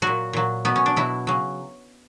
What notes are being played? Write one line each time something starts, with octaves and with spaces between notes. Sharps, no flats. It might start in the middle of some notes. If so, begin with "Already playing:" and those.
A#2 F#3 F#4
A#2 F#3
B2 F#3 B3
C#4
D4
B2 F#3 E4
C#3 F#3